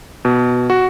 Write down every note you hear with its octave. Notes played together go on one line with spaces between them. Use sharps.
B2
F#4